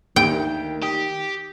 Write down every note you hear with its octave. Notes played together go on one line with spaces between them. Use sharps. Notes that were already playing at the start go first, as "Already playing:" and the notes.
D2 D#3 A#3 G4 G5
G4 D#6